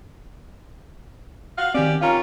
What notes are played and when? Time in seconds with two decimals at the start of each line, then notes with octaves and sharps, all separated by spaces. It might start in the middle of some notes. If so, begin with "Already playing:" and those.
1.58 F#4 F5
1.75 D#3 C4 C#4 G4 D5
2.01 D#3 C#4 F4 F5 A#5